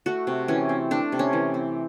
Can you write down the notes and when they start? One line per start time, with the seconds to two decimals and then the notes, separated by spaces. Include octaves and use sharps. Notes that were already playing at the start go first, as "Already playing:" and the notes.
0.06 A3 F#4
0.27 C3
0.48 E3 C#4
0.69 C4
0.91 A3 D4
1.12 C3
1.19 C#4
1.33 E3
1.54 C4